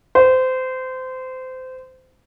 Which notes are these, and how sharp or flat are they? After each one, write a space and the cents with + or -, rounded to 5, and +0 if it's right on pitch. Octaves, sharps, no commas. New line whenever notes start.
C5 -25